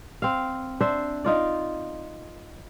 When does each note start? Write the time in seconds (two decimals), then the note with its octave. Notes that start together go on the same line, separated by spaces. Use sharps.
0.22 C4 F5
0.81 D4 C5 E5
1.24 D#4 F4 D5